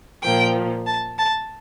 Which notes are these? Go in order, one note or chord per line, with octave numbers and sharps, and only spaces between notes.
A#2 F3 A#3 G5
A5
A5